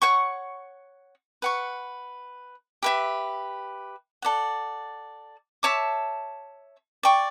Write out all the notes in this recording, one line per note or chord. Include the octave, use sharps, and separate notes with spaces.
C#5 F#5 C#6
B4 F#5 C#6
G4 B4 E5
A4 D5 F#5
C#5 E5 A5 D6
D5 G5 C#6